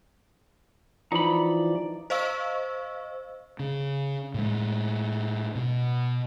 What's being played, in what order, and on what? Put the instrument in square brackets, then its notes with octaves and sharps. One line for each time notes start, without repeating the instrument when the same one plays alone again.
[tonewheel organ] E3 F3 D5 [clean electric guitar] D#4 B5
[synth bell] C5 D#5 F5 C#6 E6
[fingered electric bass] C#3
A2 G#3
B2